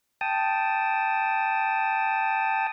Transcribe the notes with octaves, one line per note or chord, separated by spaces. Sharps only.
G5 A5 D#6